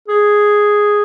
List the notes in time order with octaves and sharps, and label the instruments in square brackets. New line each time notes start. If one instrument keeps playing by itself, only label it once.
[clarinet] G#4